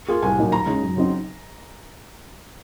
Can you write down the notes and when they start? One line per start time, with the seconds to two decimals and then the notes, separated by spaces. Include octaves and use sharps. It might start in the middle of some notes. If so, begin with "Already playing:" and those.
0.08 A#3 F4 G#4
0.22 C2 G#5
0.38 A#2 F#3 A#3 D#4
0.51 D#2 A#5
0.66 C#3 G#3 D#4
0.82 F#2
0.95 C#3 F#3 C4 D#4